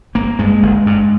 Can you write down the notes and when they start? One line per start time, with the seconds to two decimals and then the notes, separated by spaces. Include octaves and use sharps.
0.15 G1 A#3
0.39 G2 G#3
0.63 G1
0.86 G2